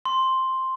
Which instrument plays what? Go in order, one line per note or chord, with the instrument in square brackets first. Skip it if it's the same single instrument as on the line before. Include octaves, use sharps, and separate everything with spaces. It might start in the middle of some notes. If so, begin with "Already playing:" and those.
[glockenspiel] C6